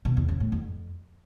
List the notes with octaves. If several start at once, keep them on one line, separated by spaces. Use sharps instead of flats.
B2
E2
C#3
A2
F2